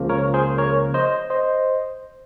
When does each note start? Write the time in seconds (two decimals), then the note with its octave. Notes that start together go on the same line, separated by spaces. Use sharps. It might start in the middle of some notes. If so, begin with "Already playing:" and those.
Already playing: C#2 C#3 F3 A#3
0.09 A#4 C#5
0.34 G#4 C5
0.58 A#4 C#5
0.94 C5 D#5
1.30 C5 D#5